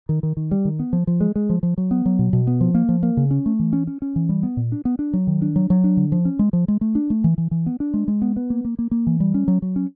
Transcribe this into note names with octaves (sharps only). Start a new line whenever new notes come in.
D#3
D#3
D#3
G3
D#3
B3
F3
F3
G#3
G#3
F3
F3
F#3
B3
F#3
B2
B2
B3
F3
A#3
F3
A#3
C#3
C#4
A3
E3
C#4
C#4
C#4
E3
G3
B3
A#2
D4
B3
D4
F#3
D#3
D4
F#3
F#3
D4
D3
F3
C#4
G#3
F3
G#3
A3
D4
A3
E3
E3
E3
B3
D4
G#3
G#3
B3
B3
A#3
A#3
A#3
A#3
E3
G3
C#4
F#3
F#3
C#4